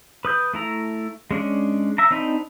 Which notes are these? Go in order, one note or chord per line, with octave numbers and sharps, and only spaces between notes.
B4 D#6 G6
A3 E4 A#5
G#3 C#4 D4
E5 A#5
C4 D4 D#4 B5